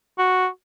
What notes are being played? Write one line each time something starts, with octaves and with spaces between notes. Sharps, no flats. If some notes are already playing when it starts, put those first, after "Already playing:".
F#4